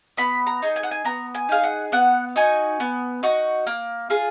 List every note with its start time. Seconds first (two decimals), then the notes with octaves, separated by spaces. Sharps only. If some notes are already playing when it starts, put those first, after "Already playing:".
0.17 B3 B5
0.47 A#5
0.62 D#4 G#4
0.76 G#5
0.83 F#5
0.91 G#5
1.05 B3 A#5
1.35 G#5
1.49 D#4 G#4 F5
1.63 F#5
1.92 B3 F#5
2.36 D#4 F#4 G#5
2.80 B3
3.23 D#4 F#4
3.67 A#3
4.10 F4 G#4